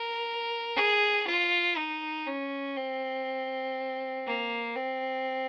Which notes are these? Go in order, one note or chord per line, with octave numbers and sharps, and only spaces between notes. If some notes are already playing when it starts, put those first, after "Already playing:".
Already playing: A#4
G#4
F4
D#4
C#4
C4
A#3
C4